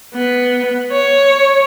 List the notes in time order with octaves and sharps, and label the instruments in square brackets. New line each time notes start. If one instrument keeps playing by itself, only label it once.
[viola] B3
C#5